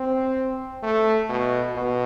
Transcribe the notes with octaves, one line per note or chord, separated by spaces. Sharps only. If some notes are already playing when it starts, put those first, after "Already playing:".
Already playing: C4
A3
B2
B2